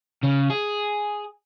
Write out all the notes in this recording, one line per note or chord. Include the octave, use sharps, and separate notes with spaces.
C#3
G#4